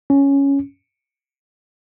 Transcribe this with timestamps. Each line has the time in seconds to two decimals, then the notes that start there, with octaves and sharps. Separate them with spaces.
0.10 C#4